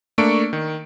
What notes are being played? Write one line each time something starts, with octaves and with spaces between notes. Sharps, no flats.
A3 A#3 D4 C#6 C#7 D7
D#3